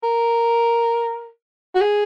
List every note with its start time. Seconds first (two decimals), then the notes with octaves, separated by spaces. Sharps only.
0.03 A#4
1.75 F#4
1.81 G#4